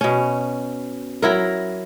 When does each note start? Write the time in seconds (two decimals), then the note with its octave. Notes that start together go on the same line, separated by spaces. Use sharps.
0.01 B2 C#4
1.22 F#3 E4 A#4